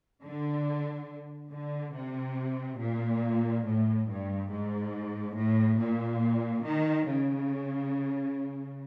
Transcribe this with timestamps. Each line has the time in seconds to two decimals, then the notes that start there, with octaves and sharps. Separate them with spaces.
0.23 D3
1.51 D3
1.94 C3
2.79 A#2
3.65 A2
4.09 G2
4.51 G#2
5.37 A2
5.79 A#2
6.66 D#3
7.08 C#3